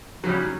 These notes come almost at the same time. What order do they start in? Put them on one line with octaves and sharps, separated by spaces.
F#3 C#3 G3